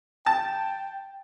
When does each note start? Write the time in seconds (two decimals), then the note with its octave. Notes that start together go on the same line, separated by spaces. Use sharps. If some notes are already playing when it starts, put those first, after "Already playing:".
0.26 G5 A5